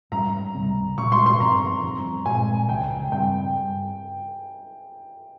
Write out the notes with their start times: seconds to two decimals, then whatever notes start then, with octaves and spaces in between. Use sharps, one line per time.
0.12 G#2 G3 C#4 A#5
0.55 C#2 C3 G3 C4
0.97 A#2 G#3 C#4 C#6
1.12 C6
1.26 C6
1.40 G2 F3 C4 A#5
1.83 G2 F3 C4
2.26 A#2 G#3 C4 G#5
2.69 C#2 C#3 F3 G5
3.12 G2 G3 C4 G5